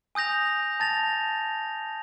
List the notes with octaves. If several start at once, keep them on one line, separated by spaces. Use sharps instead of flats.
G#5 D#6 G6 A#6 F7
A5 A6 A#6 F7